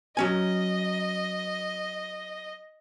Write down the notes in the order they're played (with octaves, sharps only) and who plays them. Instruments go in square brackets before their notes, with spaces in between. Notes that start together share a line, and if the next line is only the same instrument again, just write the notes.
[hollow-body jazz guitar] F#3 C#4 G#5 [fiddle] D#5